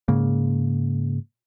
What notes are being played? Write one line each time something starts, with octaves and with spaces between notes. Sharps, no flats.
G#2 C#3 A#3